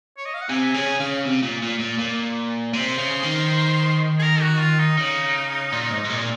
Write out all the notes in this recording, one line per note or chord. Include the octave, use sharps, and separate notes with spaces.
C#5
D#5
F5
F#5
C3 G#5
C#3 G#5
C#3 F5
C3
A#2
A#2
A#2
A#2
C3 C5
C#3
D#3
G#4
A#4
F#4
F4
D#4
C#3 D#4
A#2
G#2
G#2
A#2